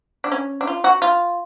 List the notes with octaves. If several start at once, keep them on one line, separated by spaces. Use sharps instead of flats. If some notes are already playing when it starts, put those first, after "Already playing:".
D4
C#4
D4
F4
F#4
F4